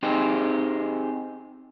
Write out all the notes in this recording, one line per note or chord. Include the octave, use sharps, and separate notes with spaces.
C4 D#4 G4 G#4 C5